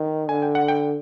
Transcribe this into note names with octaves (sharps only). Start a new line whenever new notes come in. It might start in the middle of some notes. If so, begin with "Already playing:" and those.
Already playing: D#3
D3 G#5
G5
F#5
G5